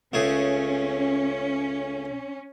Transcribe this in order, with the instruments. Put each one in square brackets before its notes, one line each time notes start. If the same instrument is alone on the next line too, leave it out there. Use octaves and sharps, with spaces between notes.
[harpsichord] C#2 A3 G#4 [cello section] C#4